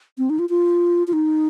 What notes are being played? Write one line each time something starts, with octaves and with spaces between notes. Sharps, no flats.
C4
D#4
F4
F4
F4
D#4